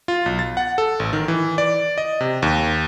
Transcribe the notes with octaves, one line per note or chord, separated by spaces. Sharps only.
F4
B1
A6
F#5
A4
A1
D#3
E3
D5
D#5
C3
D#2